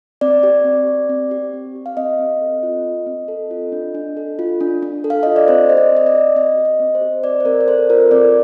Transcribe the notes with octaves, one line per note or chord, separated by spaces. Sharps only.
C4 D5
G4
C4
G4
C4
G4
C4
G4
F5
C4 D#5
C4
A4
F4
C4
C4
A4
F4
D4
D4
A4
F4
D4
D4
A4
F5
F4 D#5
D5
C4 C5
G4 D#5
D5
C4 D#5
D5
G4
C4 D#5
G4
D#5
C4
C5
G4
C4 D5
C5
C4 A#4
D5
A4 C5
F4 A#4
C4 D5